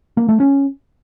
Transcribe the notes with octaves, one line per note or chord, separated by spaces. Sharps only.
A#3
A3
C#4